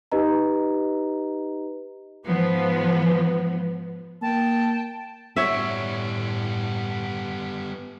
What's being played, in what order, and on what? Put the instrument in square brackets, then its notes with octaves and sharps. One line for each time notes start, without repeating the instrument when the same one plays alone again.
[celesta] D#4 G4 B4 D#5 A#5
[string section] G#2 F3 B3
[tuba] A#3 [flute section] G5 A5
[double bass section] A2 [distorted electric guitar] G3 B3 [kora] C#5 E5